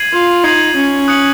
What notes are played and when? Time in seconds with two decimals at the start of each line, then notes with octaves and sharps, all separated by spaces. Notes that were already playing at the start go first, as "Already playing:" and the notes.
Already playing: G#6 C7 D#7 F#7
0.13 F4
0.44 D#4 G#6 C7 D#7 F#7
0.76 C#4
1.08 D#6 F#6 C#7 F#7